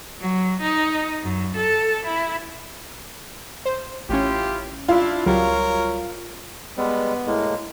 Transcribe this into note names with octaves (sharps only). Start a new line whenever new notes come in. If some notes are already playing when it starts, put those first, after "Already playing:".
F#3
D#4
F#2
A4
E4
C5
A1 C#4 E4 F4 G4
D4 E4 F4
C#2 F#3 G3 A#4 C#5
G3 G#3 B3
A2 G#3 A#3